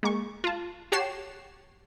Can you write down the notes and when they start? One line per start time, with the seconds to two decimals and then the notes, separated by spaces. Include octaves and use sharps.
0.03 G#3 A#3 C#6
0.44 F4 A5
0.92 F#4 G4 C#5 A5 C7 E7